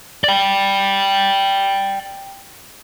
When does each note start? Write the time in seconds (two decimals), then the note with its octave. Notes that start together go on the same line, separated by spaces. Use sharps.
0.24 D5 G5